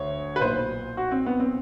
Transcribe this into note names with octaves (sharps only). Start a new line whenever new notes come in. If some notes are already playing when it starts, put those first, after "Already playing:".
Already playing: D2 D3 C#5
B4
B1 A#2 C5
F#4
C4
B3
C4